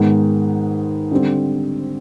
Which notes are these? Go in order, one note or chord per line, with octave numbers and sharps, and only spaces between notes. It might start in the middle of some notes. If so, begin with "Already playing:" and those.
Already playing: G#2 D#3 G#3 B3
D3 G3 C4